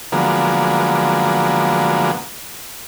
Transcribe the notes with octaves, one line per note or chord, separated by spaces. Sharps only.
D3 F3 F#3 G#3 A#3 B3